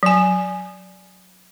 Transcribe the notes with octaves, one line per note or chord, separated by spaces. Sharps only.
F#3 G#5